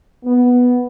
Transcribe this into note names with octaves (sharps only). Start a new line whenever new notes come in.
B3